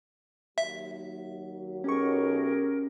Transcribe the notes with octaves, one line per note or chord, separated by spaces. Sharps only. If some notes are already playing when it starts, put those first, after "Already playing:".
D#2 F#3 E5
B1 C#4 G4 G#4 A#4 C#6